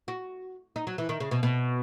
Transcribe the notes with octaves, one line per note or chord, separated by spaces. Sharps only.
F#4
D#4
F#3
E3
D#3
C#3
B2
B2